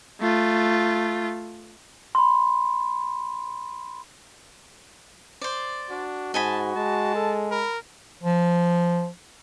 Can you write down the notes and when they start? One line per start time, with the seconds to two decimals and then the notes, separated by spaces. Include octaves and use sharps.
0.21 A3 F4
2.15 B5 C6
5.41 C5 D5
5.91 D4 F#4
6.34 G#2 D#5 G#5 A5 B5
6.76 G#3 A5
7.16 A4
7.51 A#4 B5
8.23 F3